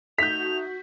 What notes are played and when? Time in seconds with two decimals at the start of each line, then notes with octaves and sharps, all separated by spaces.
0.19 A3 D#4 F#4 G6 B6 F7